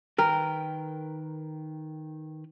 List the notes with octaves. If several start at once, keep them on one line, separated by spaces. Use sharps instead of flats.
D#3 A#4 B4 G5